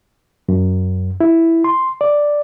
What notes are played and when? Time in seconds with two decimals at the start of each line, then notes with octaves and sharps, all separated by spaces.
0.49 F#2
1.20 E4
1.64 C6
2.01 D5